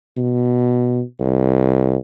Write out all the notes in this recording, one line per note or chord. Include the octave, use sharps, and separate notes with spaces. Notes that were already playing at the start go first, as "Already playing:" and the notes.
B2
C2